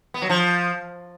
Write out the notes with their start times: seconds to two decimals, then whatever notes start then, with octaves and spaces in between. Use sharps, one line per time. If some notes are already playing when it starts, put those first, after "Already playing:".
0.14 B3
0.22 F#3
0.30 F3